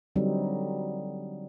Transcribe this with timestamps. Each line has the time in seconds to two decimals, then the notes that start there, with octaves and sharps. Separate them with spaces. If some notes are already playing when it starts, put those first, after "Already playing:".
0.16 D3 F#3 G3 C4 D#4